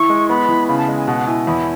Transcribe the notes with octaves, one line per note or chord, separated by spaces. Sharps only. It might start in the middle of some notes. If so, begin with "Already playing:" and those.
Already playing: E3 E4 C#6
G#3
B3 B5
E3
C#3 B5
A5
G#3
G#5
B2 F#5
E4 G#5
E2 B5